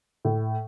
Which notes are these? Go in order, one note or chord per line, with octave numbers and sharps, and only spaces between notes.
A2